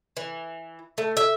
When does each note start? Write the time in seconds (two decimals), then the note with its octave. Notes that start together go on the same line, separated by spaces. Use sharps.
0.17 E3
0.98 A3
1.17 E5